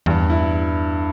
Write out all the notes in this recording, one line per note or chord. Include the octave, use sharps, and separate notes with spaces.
E2 G2
E4